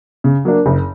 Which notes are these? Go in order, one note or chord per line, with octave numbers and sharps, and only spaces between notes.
C#3
F#3 A#3 D4
F#1